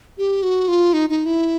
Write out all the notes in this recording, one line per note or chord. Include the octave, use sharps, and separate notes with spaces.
G4
F#4
F4
D#4
D#4
E4